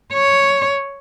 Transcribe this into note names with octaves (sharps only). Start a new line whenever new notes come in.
C#5